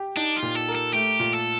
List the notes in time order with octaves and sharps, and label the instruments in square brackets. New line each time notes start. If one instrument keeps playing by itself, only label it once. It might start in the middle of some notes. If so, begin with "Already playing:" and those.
Already playing: [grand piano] G4
[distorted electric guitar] D4 [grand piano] D#4
[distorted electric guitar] F4
[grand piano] A#2
[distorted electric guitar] A4
[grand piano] A#4
[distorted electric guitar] A4
[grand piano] A3 [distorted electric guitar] G4
[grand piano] A#2
[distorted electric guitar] A4